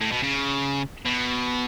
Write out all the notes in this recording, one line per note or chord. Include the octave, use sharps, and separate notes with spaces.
A2
B2
C#3
B2